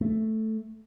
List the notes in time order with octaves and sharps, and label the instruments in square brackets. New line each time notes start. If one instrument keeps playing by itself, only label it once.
[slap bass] A3